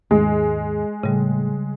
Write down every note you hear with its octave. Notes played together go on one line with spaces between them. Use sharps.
D#2 G#2 G#3
A2 C#3 G3